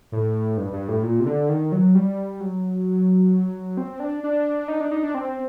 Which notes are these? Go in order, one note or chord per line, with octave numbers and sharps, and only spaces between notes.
A2
G2
G2
A2
A#2
C3
D3
D#3
F#3
G3
F#3
C4
D4
D4
D#4
D4
D#4
D4
C4